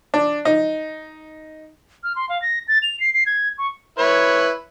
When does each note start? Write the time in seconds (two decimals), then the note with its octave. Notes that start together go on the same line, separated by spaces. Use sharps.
0.14 D4
0.45 D#4
2.04 F6
2.16 C6
2.29 F5
2.42 A#6
2.68 A6
2.82 F7
3.00 C7
3.14 C7
3.26 G#6
3.58 C#6
3.99 E4 B4 C#5